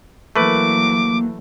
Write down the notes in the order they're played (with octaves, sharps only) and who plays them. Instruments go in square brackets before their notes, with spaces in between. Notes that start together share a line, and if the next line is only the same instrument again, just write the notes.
[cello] E3 F#3 [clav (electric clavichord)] A3 B4 [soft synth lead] A#3 [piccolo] D6